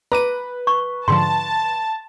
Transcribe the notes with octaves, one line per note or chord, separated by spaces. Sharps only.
B4 A#5 D6 D#7
C#6
G#2 D3 F3 A5 C6